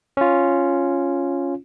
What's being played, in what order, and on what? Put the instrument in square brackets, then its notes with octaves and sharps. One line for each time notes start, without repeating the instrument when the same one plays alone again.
[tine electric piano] C#4 F4